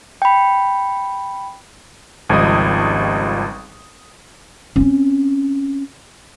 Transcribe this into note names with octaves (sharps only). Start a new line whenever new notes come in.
G5 B5
G#1 C#2 F3 G3 D#5 D#6
C4 C#4